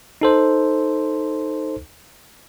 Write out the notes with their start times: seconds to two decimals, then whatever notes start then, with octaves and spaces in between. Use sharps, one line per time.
0.21 D#4 A4 C5